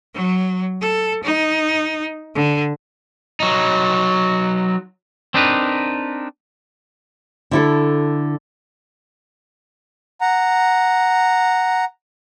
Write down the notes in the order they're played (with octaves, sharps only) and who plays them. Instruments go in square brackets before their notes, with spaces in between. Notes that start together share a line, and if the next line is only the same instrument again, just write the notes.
[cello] F#3
A4
D#4
D3
[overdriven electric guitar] F#3 D#4
[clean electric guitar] C4 D4 D#4 A#4 B4
[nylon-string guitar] D3 E4 A4
[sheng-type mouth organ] F#5 A#5